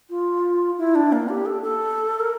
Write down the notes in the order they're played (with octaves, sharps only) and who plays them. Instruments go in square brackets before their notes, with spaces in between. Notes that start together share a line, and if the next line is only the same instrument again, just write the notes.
[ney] F4
E4
D4
A#3
G4
A4
A4
A#4